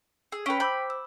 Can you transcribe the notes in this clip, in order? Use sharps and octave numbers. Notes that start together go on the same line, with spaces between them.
G#4 E6
C#4 B4 G5 B6 D7
C5 B5 D6 E6 G6
E6